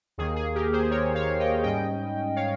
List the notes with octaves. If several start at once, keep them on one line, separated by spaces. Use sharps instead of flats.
D#2 D#3 A#3 G#4
G#4
G4 A#4
G#4 C5
A#4 C#5
C#5 F5
D#5 G5
G#2 G3 C#4 D#5 G5
C#5 F5